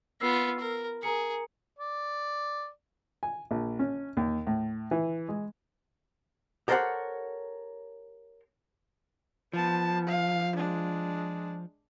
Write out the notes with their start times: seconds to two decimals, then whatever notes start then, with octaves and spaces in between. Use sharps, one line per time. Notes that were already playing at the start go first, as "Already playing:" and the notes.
0.21 B3 F4 E6 C7
0.59 A#4
1.03 G#4 A#4 A#5 C#7
1.79 D5
3.23 G#5
3.51 A#1
3.79 C#4
4.17 D#2
4.47 A2
4.91 E3
5.29 G#3
6.68 G4 A4 A#4 C5 C#5 F#5
9.53 F3 B3 A5
10.07 F5
10.56 G#3 D4